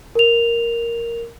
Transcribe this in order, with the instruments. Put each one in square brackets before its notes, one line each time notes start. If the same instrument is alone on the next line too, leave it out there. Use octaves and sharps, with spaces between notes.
[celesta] A#4 F7